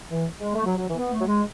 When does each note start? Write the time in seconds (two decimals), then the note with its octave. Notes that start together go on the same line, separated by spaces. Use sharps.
0.10 E3
0.40 G#3
0.55 A3
0.64 F#3
0.76 F#3
0.87 E3
0.97 B3
1.12 A3
1.20 F#3
1.26 G#3